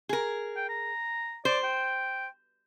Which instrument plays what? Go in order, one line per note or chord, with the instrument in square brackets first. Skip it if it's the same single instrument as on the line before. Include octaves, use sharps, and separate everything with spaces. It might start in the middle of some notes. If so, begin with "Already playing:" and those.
[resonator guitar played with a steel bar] G#4 A#4
[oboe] G5
A#5
[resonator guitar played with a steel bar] C5 [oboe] D5
[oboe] G5